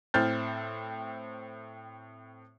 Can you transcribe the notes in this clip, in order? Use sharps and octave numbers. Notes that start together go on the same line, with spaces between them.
A2 C4 F6 G6 A6